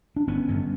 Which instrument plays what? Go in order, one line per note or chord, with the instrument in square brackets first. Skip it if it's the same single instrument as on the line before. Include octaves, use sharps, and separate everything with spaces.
[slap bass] D4
G1 B3 C#4
G2 D3